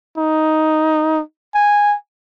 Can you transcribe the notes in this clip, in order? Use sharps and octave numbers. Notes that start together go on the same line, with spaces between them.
D#4
G#5